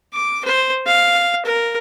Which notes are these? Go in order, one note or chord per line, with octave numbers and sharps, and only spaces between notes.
D6
C5
F5
A#4